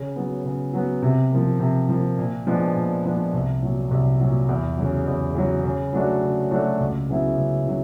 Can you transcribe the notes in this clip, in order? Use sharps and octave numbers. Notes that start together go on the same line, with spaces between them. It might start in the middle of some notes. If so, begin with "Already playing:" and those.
Already playing: C#3
F#3 B3
C#3
F#3 B3
C3
F3 A#3
C3
F3 A#3
A#2
F3 G#3 B3 D4
A#2
F3 G#3 B3 D4
C2
A#2 F#3
C2
A#2 F#3
E2
C#3 F#3
E2
C#3 F#3
C#3
F#3 A3 D4 F#4
C#3
F#3 A3 D4 F#4
C#2
C#3 F#3 B3 E4
C#2
C#3 F#3